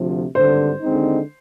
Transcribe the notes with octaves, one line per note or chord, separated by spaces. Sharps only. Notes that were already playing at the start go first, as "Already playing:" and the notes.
Already playing: D2 C3 F3
G#1 G2 D3 C5
D#2 D3 G#3 C4 D#4